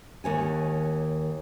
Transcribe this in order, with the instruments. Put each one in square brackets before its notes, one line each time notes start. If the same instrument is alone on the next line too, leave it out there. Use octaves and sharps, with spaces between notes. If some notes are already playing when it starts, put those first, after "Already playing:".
[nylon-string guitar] D#2 C#5 G#5